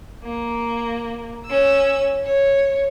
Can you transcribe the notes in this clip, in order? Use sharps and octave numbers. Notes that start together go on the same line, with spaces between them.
A#3
C#4 E6
C#5